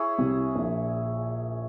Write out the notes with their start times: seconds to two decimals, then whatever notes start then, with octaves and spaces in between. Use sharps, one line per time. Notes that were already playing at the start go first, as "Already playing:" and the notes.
Already playing: E4 G#4 C#5
0.18 C2 C3
0.55 A#1 A#2